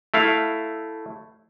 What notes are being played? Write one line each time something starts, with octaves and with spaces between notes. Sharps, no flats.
A3 E4 F5